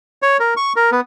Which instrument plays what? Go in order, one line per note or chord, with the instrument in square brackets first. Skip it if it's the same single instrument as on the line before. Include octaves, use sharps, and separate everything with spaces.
[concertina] C#5
A#4
C#6
A#4
B3